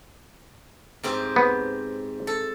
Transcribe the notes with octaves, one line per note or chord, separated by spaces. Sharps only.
G#2 C4 G4
B3
A4